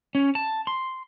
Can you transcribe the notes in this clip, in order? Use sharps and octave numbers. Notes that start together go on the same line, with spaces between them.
C#4
A5
C6